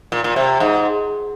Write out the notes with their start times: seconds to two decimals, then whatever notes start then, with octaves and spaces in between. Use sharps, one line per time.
0.12 A#2
0.24 A#2
0.36 C3
0.60 G#2